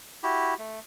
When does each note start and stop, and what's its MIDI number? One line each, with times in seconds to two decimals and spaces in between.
0.23 0.54 64
0.23 0.54 66
0.23 0.54 67
0.59 0.80 57